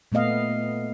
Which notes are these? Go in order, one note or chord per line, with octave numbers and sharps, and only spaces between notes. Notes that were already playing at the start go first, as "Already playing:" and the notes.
A#2 A3 B3 D#5 F5